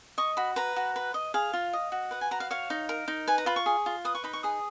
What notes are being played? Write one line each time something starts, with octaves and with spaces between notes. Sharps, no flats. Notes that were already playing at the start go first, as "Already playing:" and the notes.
D#5 C#6
F#4 B5
B4 A#5
F#4
B4
D#5
G#4 F5
F4
D#5
F#4
B4 F#5
G#5
F#4 A#5
F5
C#5 F5
D#4
A#4
D#4
B4 G#5
A#5
F4 B5
C#6
G#4
F4
B4 D#6
C#6
D#4 B5
C#6
G#4 D#6